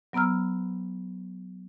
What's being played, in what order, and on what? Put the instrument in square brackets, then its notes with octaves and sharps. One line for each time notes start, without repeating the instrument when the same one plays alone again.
[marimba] F#3 B3 A#5 E6 F6